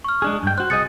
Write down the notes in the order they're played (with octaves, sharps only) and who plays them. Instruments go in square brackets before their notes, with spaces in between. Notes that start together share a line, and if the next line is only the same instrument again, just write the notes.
[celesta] C#6 F6
[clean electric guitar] G#3 D4 G#4
G2 G5
[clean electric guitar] F#4 C5 [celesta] F#6
[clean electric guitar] C2 G#4 D#5 [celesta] D#6 A6 C#7